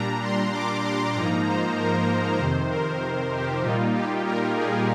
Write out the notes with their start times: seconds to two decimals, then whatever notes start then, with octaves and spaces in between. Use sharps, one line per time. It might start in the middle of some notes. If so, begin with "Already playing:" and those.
Already playing: A#2 G3 D4 A#5
0.22 C6
0.52 D6
0.84 C6
1.14 G#2 F3 A#3 D#4 A#5
1.46 C5
1.77 A#4
2.38 F2 C3 D#3 C5
2.70 A#4
3.32 G4
3.62 A#2 G3 A#3 D#4 F4
3.94 G4
4.24 A#4
4.55 G#4